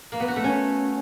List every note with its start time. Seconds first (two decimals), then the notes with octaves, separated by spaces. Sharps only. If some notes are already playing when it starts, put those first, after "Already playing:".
0.12 A#3
0.20 B3
0.28 F#4
0.36 A3
0.44 C#4